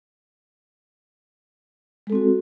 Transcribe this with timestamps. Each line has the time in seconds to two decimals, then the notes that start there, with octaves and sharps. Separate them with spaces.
2.07 G#3
2.10 A4
2.12 C4
2.15 F#4